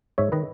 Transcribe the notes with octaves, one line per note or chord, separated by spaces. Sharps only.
G#2 C#5 E5
D#3 B4 D#5